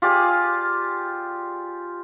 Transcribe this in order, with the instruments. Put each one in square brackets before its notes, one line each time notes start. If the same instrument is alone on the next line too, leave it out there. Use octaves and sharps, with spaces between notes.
[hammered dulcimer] F4 G4 G#4 D5